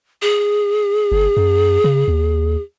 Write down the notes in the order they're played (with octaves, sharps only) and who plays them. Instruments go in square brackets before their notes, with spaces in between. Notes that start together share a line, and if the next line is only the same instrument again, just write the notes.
[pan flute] G#4
[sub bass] G1
F#2
C#3
D#2